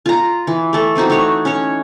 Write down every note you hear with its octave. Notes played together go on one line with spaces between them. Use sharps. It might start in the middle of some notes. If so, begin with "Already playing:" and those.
F4 A#5
E3
A3 A4
E3 C4 D#4 F#4
A3 C#5
C#4 C#5